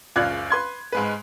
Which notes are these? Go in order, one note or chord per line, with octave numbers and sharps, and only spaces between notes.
F#1 C#2 F4 D5 F#6 G#6
B4 C6 G#6
G#2 G#3 B4